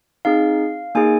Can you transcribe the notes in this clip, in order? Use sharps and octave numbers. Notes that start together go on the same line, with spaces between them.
C4 D#4 G#4 F5
A#3 D#4 G#4 G#5